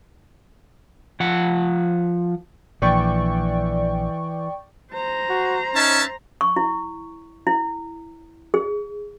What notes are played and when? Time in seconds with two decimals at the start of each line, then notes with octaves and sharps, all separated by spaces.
1.20 F3 F#5
2.82 A#1 E3 D5 G5 C#6
4.93 C5 A#5
5.30 F#4
5.75 C#4 D#4 E5 A5
6.41 C#6
6.56 E4
7.47 E4
8.54 G#4